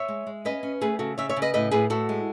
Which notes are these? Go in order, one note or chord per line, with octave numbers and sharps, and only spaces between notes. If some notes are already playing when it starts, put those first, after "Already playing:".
Already playing: C#5 E5
G#3
G#3
C#4 B4 D#5
C#4
A3 G#4 B4
C#3 F#4 A4
C#3 C#5 E5
C#5 E5
C#3
B4 D#5
A2 B4 D#5
A2 G#4 B4
A2 F#4 A4
G#3